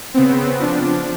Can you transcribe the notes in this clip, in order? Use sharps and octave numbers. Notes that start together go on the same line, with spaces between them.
C#3 B3 C4
F3 D4